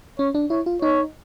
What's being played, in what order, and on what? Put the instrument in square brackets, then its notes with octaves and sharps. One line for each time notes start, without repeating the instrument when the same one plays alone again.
[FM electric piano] C#4 [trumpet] C#5
[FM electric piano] D4
[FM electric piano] E4 [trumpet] C#5
[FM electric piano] F4
[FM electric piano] D#4 [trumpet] C#5